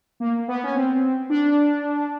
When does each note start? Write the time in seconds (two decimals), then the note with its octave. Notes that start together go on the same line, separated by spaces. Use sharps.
0.20 A#3
0.48 B3
0.63 C#4
0.75 C4
1.30 D4